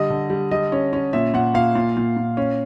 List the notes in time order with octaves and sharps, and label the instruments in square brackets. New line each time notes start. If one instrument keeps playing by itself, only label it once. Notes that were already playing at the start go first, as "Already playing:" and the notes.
Already playing: [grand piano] D3 G3 D#5
D3
G3
G3 D#5
C#4
C#4
A#2 E5
A#2 F#5
A#2 F5
A#2
A#2
A#2
C#4